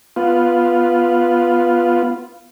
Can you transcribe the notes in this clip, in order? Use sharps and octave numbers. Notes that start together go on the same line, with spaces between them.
B3 F4